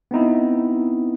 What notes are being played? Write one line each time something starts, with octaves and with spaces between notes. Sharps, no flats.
B3 C4 D#4 E4